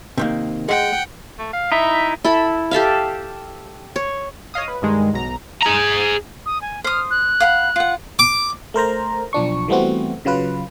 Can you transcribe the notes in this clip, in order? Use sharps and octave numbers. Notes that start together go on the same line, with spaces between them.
C3 D#3 A#3
G#3 F#5 G5
A3
F5
D#4 E4 E5
E4 A4 B5
G4 A4 E5 F5
C#5
C#5 D#5 F5 D#6
B4
G2 D#3 G#3
B1 A#5
G#4 A#5
D#6
G#5
C5 D#6 F6
F#6
F5 F#5 B5
F4 F#5
D6
A3 A#4 C5 A#5
B1 F3 D4 C#6
E3 G3 A3 B3 C4 F#4
C#3 F#3 F4 B4